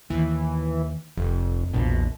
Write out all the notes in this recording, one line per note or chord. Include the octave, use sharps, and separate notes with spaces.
D#2 E3
F1 F2
E1 A#1 B2